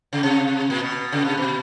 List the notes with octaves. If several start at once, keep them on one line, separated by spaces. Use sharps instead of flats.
C#3
C3
A#2
B2
C#3
C3
B2